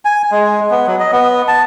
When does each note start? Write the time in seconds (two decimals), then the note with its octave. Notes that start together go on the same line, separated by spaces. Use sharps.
0.05 G#5
0.31 G#3
0.70 B3
0.87 F#3
1.00 D#5
1.12 B3
1.48 A5